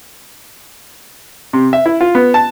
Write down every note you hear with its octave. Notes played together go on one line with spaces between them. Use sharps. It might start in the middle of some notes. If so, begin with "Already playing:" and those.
C3
E5
E4
F4
B3
A5